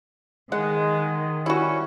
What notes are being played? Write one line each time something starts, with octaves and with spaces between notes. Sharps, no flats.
D#3 G#3 F#5
G3 C#4 E4 F#4